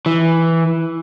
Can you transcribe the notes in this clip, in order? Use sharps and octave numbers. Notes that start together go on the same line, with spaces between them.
E3